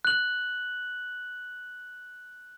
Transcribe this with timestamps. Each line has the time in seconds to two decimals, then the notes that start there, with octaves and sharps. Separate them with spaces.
0.05 F#6 F#7